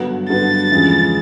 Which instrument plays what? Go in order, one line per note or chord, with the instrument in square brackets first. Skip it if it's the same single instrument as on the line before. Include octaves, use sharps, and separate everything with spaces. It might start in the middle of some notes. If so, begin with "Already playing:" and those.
Already playing: [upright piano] G2 D3 F#3 B3
[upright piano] G2 D3 F#3 B3 [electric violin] A6
[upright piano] E2 C#3 F3 G#3